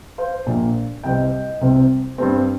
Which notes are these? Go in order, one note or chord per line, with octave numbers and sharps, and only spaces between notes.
C5 F5
A#1 A#2 A#3
C2 C3 G3 C4 D#5 G5
C2 C3 G3 C4
G2 G3 C4